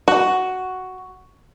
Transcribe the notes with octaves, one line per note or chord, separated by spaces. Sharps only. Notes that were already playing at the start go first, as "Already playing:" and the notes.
F#4